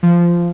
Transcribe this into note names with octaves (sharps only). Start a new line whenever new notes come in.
F3